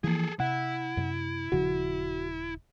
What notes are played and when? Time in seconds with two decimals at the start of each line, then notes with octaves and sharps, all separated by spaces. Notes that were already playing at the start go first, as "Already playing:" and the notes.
0.04 E3 F3 A#3 G#4 A4
0.40 C3 E4 F#5
0.97 F#2 C3
1.52 D#1 C#3 F3 F#4